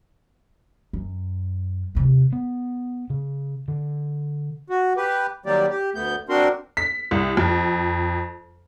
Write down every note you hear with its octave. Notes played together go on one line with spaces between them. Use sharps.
F#2
D#2 C3
B3
C#3
D3
F#4
G4 B4
D#3 F#3 G3 A#3 G4 D5
G4
D2 A3 B3 G6
C4 D4 F#4 A#4 C6
B6
C2
F2